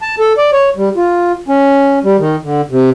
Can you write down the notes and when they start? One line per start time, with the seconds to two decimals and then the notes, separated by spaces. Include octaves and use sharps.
0.02 A5
0.19 A4
0.38 D5
0.53 C#5
0.76 G3
0.96 F4
1.48 C#4
2.04 G3
2.19 D#3
2.44 D3
2.71 C3